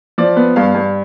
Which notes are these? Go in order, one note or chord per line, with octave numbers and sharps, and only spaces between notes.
F3 D5
B3
G2 F5
G2